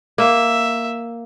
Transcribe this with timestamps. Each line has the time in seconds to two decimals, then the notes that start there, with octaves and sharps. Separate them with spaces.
0.18 A#3 E5